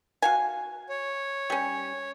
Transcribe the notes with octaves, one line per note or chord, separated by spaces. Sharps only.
F#4 F5 G#5
C#5
G3 C#4